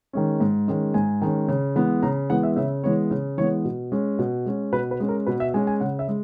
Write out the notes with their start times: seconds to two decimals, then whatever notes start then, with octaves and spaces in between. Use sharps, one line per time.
0.13 D#3 G#3 C#4
0.40 G#2
0.68 D#3 G#3 C#4
0.94 G#2 G#5
1.22 D#3 G#3 C#4
1.48 C#3
1.76 E3 G#3 B3
2.03 C#3 A#5
2.30 E3 G#3 B3 F#5
2.43 E5
2.56 C#3 E5
2.83 E3 G#3 B3 C#5
3.11 C#3
3.38 E3 G#3 B3 C#5
3.65 B2
3.92 G#3 C#4
4.19 B2
4.46 G#3 C#4
4.72 B2 B4
4.91 B4
5.00 G#3 C#4
5.09 A#4
5.27 B2 B4
5.40 E5
5.54 G#3 C#4 G#5
5.67 G#5
5.80 C#3 F#5
5.99 E5
6.08 G#3